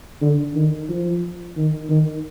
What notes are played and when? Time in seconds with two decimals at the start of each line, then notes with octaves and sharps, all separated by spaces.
0.21 D3
0.55 D#3
0.89 F3
1.57 D#3
1.89 D#3